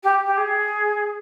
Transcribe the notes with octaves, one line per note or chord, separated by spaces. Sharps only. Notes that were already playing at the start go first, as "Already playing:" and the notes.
G4
G4
G#4